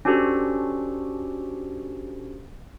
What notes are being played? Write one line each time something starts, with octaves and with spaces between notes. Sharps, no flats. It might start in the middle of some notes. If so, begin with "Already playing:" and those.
C#4 D4 F#4 G4 A4 C5